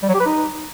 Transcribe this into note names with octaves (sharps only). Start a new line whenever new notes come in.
G3
F#3
G4
B4
D#4